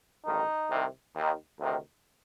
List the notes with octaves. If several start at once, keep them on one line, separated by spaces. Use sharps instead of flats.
A1 G2 D#3 D#4
C2 C3 D#3
D#2 D#3
D2 C3 D#3